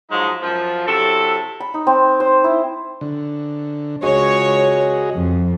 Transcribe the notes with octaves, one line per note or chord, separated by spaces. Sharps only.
G#2 F3 F#3 G#3 D#4
F#2 F3
C3 F#3 E4 A4
B5
D#4
C4
C5
E4
D3
C#2 F#4 G#4 C#5 D#5
F2